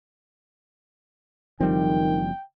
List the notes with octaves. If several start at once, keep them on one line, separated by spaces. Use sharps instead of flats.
F#1 D#3 F3 G3 C4 G5